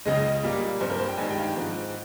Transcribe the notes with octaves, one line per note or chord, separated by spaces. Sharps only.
C#2 C#3 G#3 D#5
A#2 G3 A#3
G2 G3 C4 C5
A#4
C5
G5
G2 D#3 G#3 G#5
G5
F5
G5
G#2 F3 C4